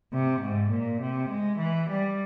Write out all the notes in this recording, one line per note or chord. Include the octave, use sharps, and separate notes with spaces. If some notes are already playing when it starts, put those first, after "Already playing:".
C3
G#2
A#2
C3
G#3
E3
G3